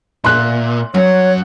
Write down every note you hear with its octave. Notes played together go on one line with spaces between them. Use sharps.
A#2 E5 C6 F#6
F#2 F#3 C#5 F#5